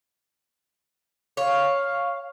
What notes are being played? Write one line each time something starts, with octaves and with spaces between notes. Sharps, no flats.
C#5 F5